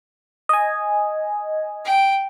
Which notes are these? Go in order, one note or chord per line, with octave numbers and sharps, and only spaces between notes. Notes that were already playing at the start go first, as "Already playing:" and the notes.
D#5 G#5
G5